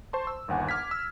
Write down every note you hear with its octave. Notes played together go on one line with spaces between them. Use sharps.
C5 A5 C6 C#6
E6
G1 D#2 F#5 G#5
D6 F6 G#6 B6
E6